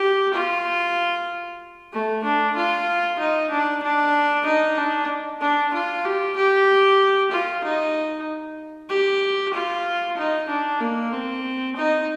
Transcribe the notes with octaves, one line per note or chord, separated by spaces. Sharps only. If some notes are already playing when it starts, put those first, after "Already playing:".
Already playing: G4
F4
A3
D4
F4
D#4
D4
D4
D#4
D4
D4
F4
G4
G4
F4
D#4
G4
F4
D#4
D4
A#3
C4
D#4